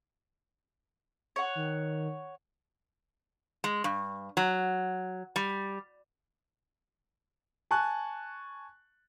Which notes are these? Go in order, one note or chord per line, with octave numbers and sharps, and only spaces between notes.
C#5 F#5
D#3
G#3
G2
F#3
G3
G#5 A5 C#6 F#6